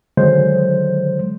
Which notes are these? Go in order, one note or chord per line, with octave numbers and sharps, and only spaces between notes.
D3 D#3 F#3 G#3 C5